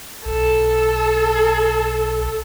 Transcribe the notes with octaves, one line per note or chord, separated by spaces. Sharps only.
B1 A4